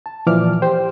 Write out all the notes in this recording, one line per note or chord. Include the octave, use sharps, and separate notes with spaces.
A5
A#2 E3 F3 D5 D6 F6
G4 C5 G5